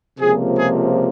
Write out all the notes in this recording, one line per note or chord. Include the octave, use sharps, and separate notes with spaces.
C#2 C3 F3 A#3 G#4
G#4